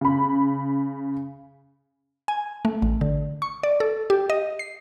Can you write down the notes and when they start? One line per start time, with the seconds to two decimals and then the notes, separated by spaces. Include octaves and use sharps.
0.01 C#3 B5
2.28 G#5
2.65 A3
2.82 A1
3.01 D3
3.42 C#6
3.63 D5
3.80 A4
4.10 G4
4.30 D#5
4.59 C7